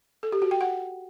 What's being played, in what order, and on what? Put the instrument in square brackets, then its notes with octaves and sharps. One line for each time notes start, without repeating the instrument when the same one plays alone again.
[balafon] A4
G4
F#4
G5
F#5